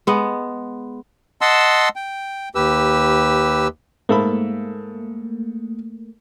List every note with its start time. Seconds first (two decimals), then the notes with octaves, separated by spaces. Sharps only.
0.07 G#3 B3
1.41 D#5 F#5 A5 C6 E6
1.96 G5
2.55 D#2 G4 B4 E6
4.09 G#2 A3 A#3 A4 B5